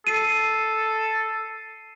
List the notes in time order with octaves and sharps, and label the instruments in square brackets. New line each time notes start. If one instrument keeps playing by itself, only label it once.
[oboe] A4 [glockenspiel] C7 D#7